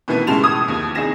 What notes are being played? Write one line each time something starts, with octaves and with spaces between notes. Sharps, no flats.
B2 D#3 E3 A3 B3
A2 C#3 G#3 A5 E7 F7
A2 D#6 G#6
D#2 F3
C2 D#4 G#4 A#6 E7